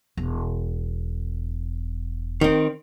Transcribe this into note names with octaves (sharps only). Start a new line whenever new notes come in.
E1
D#3 C4